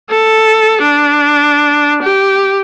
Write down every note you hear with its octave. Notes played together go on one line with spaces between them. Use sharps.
A4
D4
G4